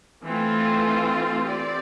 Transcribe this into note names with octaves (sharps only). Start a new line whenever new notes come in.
E3 A3 C4 F4
C4 G4 D5